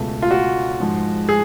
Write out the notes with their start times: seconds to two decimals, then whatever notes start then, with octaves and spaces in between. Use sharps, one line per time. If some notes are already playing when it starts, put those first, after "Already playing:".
Already playing: C#2 B2 A3
0.22 F4
0.31 F#4
0.80 G#2 F3 G#3
1.29 G#4